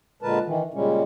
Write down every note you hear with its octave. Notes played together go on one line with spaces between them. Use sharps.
A#2 D3 G#3 A#4 B4 A5
D#3 E3
A#2 C#3 G3 G#3 C#4